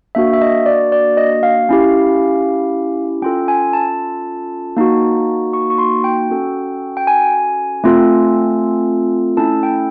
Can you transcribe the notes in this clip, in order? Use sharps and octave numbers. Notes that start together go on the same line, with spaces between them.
A#3 D4 F#4 E5
E5
D#5
D5
D5
D#5
F5
C#4 E4 G4
C#4 F4 A4 G5
G#5
A5
A#3 D#4 F#4
C#6
C#6
C6
G5
C#4 F#4 A4
G5
G#5
A3 C4 F4 A4
A3 C#4 E4 A4 A5
G5